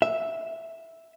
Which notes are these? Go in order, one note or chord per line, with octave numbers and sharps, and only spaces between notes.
E5